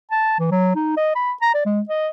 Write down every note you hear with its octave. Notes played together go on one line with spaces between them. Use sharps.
A5
E3
F#3
D#4
D#5
B5
A#5
D5
G#3
D#5